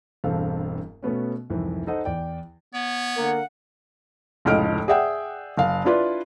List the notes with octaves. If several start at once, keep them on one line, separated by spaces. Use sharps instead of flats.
E1 E2 G2 C4 A4 F5
B2 A3 B3 C#4
C2 F2 G#2 E3
D#4 A4 C5 D#5 F#5
E2 D5 G5
B3 C#5
D3 A#3 F#5
F1 C#2 A2 D#5 F6 D7
G#4 D5 E5 F#5 G5
F#1 F5
D4 E4 F4 B4 D5